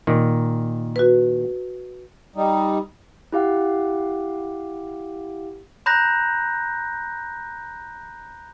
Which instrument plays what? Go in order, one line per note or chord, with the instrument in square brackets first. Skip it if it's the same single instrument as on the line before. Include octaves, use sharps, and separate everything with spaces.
[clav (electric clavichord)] A#2 D#3
[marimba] F#4 B4
[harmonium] G3 D#4
[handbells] E4 G4 F5 F#5
[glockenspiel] A#5 B5 F#6 G6 A#6